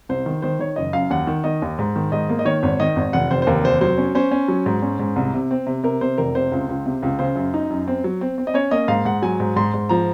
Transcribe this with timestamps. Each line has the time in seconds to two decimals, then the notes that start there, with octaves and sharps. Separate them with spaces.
0.09 C2 C5
0.26 D#3
0.42 D#3 C5
0.59 D#3 C#5
0.76 F#1 D#5
0.93 F#2 F5
1.10 D#2 F#5
1.27 D#3
1.44 D#3 D#5
1.62 D#2
1.79 G#2
1.96 D#3
2.12 G#2 D#5
2.29 A#3
2.39 D#5
2.45 D#3 C#5
2.63 G#1
2.80 D#3 D#5
2.96 G#1
3.13 F1 F#5
3.30 F1 C5
3.42 C5
3.47 D#2 A#4
3.64 F1 C5
3.81 F#3 C5
3.98 C#4
4.15 C#4 C5
4.31 C#4
4.48 F#3
4.66 G#2
4.82 C#4
4.99 G#2
5.16 C2
5.34 C3
5.51 C4
5.67 C3
5.83 C3 A#4
6.01 C3 C5
6.18 F1 A#4
6.35 C3 C5
6.52 C#2
6.69 C#2
6.86 C3
7.03 C#2
7.19 C#3 C5
7.36 F#2
7.54 D#4
7.70 F#2
7.88 C4
8.04 F#3
8.21 C4
8.38 C4
8.47 D#5
8.54 C#4 C#5
8.71 A#3 D#5
8.88 G#2 F5
9.05 G#2 F#5
9.22 F#3 G#5
9.40 G#2
9.56 G#2 C6
9.74 G#2
9.89 F3 A#5